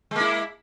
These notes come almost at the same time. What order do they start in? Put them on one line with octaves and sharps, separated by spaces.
G#3 A#3 E4